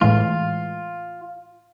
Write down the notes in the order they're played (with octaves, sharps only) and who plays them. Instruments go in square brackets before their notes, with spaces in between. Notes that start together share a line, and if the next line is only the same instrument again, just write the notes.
[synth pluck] A2 E3 G#3 [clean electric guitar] F4